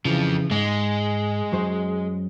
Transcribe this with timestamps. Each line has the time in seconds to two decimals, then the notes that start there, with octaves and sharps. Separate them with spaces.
0.05 F2 C#3 E3 F3
0.51 G#2 G#3
1.52 F#2 F#3 C5